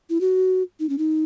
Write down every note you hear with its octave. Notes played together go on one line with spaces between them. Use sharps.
E4
F#4
D#4
C#4
D#4